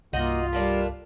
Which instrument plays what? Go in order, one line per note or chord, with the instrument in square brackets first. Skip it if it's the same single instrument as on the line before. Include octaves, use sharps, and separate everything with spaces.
[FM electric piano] C2 G2 [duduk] A#3 [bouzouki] D#4 F#4 D#5 [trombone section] F4
[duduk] G3 [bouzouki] A3 A#3 D4